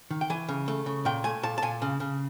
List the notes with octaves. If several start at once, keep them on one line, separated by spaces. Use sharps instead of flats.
D#3
G5
E3 G#5
C#3
A3
C#3
A#2 G5
A3 G#5
A#2 A5
A5
A#2 G#5
C#3
C#3